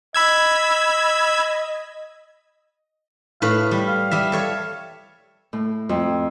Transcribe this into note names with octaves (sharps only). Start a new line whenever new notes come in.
D#5 B5 E6 G#6
A2 B4 F5 B5
G3
F5
G3 E5
A4 C#5 E5
A2
F2